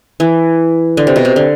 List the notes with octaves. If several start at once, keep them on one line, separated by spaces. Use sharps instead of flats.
E3
D3
C3
B2
C3
D3